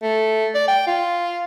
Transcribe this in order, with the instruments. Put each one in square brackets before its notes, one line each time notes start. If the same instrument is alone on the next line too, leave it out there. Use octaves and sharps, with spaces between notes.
[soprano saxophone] A3
D5
G5
F4